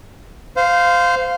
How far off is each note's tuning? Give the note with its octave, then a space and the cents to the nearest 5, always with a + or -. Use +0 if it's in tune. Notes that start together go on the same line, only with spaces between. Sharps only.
C5 -20 F5 +0